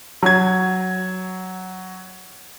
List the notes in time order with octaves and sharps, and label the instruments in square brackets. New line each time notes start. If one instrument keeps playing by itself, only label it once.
[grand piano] F#3 G#6